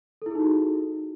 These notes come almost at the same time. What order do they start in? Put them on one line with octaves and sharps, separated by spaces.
A4 E4 G#4 D#4 F#4